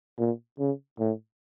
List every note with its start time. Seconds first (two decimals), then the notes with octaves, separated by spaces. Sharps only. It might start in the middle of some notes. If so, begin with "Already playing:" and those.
0.19 A#2
0.59 C#3
1.00 A2